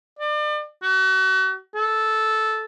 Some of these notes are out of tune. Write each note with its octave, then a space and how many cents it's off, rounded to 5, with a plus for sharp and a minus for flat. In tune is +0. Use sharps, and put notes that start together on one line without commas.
D5 +35
F#4 +40
A4 -10